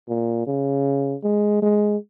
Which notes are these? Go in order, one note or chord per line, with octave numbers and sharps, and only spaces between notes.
A#2
C#3
G#3
G#3